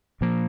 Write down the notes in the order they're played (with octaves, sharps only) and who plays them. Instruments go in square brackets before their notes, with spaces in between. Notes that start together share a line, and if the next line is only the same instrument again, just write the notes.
[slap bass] A#2 F3 A#3